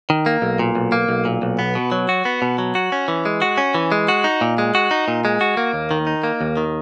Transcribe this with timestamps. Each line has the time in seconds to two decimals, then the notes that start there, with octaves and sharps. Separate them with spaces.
0.10 D#3
0.26 A#3
0.42 B1
0.59 A#2
0.75 B1
0.92 A#3
1.09 B1
1.25 A#2
1.42 B1
1.59 B3
1.75 B2
1.92 F#3
2.09 F#4
2.25 B3
2.42 B2
2.58 F#3
2.75 F#4
2.92 C#4
3.08 E3
3.25 G#3
3.42 F#4
3.58 C#4
3.74 E3
3.92 G#3
4.08 F#4
4.24 D#4
4.41 A#2
4.58 G#3
4.75 F#4
4.91 D#4
5.08 A#2
5.25 G#3
5.41 F#4
5.57 A#3
5.73 D#2
5.91 D#3
6.07 D#4
6.24 A#3
6.41 D#2
6.57 D#3